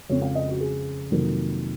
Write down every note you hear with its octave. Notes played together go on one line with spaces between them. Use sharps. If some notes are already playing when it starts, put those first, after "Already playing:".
F2 C#3 G#3 C4 C#5
F5
D#5
F#4
G#4
F2 C3 D#3 F#3 A#3 A#4